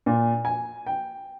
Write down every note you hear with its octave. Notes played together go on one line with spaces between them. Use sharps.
A#2
G#5
G5